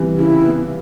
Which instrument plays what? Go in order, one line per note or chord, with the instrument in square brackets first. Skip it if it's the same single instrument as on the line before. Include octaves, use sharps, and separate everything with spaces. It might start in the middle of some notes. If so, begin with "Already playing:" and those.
Already playing: [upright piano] C3 E3 G3 B3
[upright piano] C#3 [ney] E4
[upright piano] B3